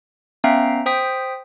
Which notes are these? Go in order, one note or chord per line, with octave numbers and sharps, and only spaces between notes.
B3 C#4 E5 F5 G5 A#5
C5 G5 D#6 B6